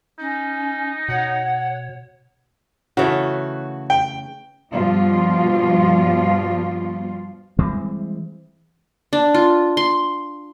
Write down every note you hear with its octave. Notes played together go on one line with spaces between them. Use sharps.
C#4 D#4
B2 C#5 F#5
C#3 E3 A3 F#4
G5
G2 B2 F3 G3 F4
E3 G3 G#3 C4
D4
F4
C6